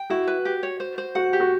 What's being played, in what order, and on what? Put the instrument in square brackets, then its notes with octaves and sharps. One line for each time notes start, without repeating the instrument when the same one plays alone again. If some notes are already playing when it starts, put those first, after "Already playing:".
Already playing: [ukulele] G5
[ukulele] E4 [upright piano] F#4
[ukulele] B4
G4
C#5
C5
C5
[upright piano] F#4 [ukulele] F#5
[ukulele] G4
[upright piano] F#4